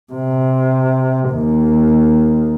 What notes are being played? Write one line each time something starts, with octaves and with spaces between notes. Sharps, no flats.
C3
D#2